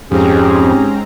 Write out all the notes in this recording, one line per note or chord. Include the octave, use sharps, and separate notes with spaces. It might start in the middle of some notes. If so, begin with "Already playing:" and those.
F2 G#2 C4 C#4 G4 G#4 A#5